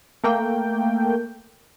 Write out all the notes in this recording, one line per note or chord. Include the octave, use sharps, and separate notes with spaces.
A3 A#3 G5